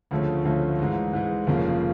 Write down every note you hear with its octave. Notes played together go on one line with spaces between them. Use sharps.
D2 C#3 F3 A3 C#4
D2 C#3 F3 A3 C#4
G#2 E3 G#3
G#2 E3 G#3
F1 F2 C#3 F3 A#3